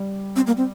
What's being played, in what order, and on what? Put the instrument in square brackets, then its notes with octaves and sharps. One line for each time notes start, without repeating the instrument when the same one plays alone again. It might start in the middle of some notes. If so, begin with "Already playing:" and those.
Already playing: [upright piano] G3
[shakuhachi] C4
A#3
C4